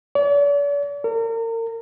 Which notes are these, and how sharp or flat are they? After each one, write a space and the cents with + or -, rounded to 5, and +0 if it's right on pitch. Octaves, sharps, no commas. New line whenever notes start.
D5 -45
A#4 -35